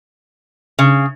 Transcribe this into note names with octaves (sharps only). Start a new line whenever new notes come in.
C#3